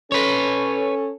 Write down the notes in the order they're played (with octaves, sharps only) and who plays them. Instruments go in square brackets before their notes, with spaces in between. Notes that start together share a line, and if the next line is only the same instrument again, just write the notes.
[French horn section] C#4 A4 [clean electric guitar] B4 C#5